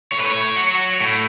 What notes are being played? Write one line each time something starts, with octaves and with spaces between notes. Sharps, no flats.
A2 C#5
B4
C#5
F#3
A2